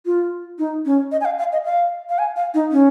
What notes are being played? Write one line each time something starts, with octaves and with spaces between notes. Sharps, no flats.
F4
D#4
C#4
D#5
G#5
F5
F5
D#5
F5
F5
G#5
F5
D#4
C#4